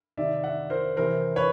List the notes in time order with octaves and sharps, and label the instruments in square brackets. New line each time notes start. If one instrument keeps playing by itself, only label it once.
[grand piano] C3 D#3 D5 E5
E5 F#5
A#4 C5
C3 E3 A#4 C5
B4 C#5